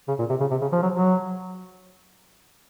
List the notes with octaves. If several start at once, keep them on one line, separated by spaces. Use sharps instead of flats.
C#3
A#2
C3
C#3
C3
C#3
F3
F#3
F#3